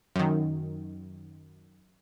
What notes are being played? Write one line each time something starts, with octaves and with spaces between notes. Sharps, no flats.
F#2 D#3